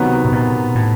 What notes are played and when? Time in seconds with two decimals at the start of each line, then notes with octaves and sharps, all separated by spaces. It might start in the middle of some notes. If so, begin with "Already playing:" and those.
Already playing: C3 D#3 F#3 B3
0.25 B2
0.32 A#2
0.75 A2